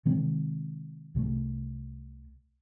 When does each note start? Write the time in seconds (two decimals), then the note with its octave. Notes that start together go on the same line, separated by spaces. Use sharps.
0.06 C3 D#3 G#3 C4
1.15 C2 C3 F3 A3